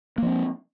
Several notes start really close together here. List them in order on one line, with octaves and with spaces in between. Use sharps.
A#3 F3 C4